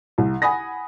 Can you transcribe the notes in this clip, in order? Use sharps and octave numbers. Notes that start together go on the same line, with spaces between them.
C2
F#5 G#5 B5 D#6 A#6